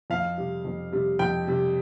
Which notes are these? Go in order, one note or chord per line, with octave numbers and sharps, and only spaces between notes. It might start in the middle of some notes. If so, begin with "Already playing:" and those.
F2 F5
C3 G3
F2
C3 G3
F2 G5
C3 G3